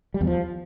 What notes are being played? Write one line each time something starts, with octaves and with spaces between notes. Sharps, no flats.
G3
E2
F3